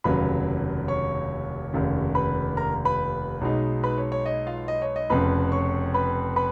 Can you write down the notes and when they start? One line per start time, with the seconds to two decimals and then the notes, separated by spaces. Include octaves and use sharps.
0.04 F1 D#2 C#3 F#3 B4 B5
0.88 C#5 C#6
1.73 F1 D#2 C#3
2.15 B4 B5
2.57 A#4 A#5
2.85 B4 B5
3.41 B1 B2 G#3 D#4
3.84 B4 B5
3.98 C#5
4.12 C#5
4.26 D#5
4.47 F4 F5
4.68 D#5
4.82 C#5
4.96 D#5
5.10 F1 F2 C#3 B4 B5
5.52 C#5 C#6
5.94 B4 B5
6.36 B4 B5